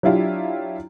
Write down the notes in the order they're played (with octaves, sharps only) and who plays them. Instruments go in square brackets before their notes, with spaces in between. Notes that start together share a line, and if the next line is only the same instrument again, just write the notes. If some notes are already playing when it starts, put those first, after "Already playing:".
[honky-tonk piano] F#3 D4 E4 F4 G4